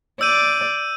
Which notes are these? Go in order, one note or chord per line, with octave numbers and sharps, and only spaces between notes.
D5 E6 G6 D#7